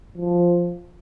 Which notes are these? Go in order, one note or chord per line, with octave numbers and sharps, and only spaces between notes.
F3